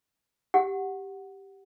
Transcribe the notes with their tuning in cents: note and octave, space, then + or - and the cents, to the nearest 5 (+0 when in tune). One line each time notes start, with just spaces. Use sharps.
G4 +0 F#5 +0